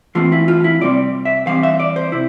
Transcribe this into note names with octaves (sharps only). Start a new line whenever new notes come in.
E3 A3 C4 F4
E4
F4
E4
C3 G3 C4 D5
E5
E3 G3 C4 F5
E5
D5
C5
C3 E4